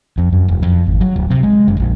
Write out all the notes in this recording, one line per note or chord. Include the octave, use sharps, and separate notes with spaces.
F2
F#2
E1
F2
G#1
F#3
D1
C3
G#3
F#1
A#1